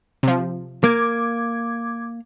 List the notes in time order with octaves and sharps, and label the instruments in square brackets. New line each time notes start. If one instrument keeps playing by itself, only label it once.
[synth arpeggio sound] C3 F3
[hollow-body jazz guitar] A#3 [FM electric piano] D6 G#6